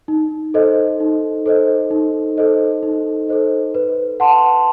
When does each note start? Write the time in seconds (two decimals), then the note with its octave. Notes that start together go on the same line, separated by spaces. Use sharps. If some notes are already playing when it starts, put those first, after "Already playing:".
0.08 D#4
0.54 A4 C5 D#5
1.00 D#4
1.46 A4 C5 D#5
1.91 D#4
2.38 A4 C5 D#5
2.83 D#4
3.29 A4 C5 D#5
3.75 B4
4.20 F#5 A5 C6